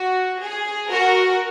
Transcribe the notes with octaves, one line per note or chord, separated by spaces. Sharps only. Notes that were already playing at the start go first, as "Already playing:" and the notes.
Already playing: F#4
G#4
F#4 A#4